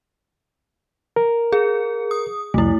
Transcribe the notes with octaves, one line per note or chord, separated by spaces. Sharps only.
A#4
G#4
D#6
C2 F2 A3 E4